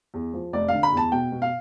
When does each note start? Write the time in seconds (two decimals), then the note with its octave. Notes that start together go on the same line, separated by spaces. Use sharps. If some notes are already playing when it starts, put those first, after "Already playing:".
0.14 E2
0.34 F3
0.53 F1 D5
0.68 D3 F5
0.83 B5
0.92 E2 A5
1.12 B2 G5
1.32 B2
1.42 F5